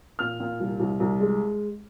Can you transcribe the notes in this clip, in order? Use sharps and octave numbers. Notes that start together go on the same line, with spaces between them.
A#2 F6
A#2
C2
C2
C2
G#3